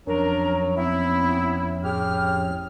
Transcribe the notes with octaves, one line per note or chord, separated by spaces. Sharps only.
F2 F#3 C#4 D4 A#4
B3 C4 E4
A2 G4 G#4 F6